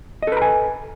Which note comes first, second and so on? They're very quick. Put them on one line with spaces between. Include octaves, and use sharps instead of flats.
D#5 A4 B4 A#5 G#5